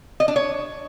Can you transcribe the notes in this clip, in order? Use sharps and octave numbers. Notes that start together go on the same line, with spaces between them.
D#5
D4
C#5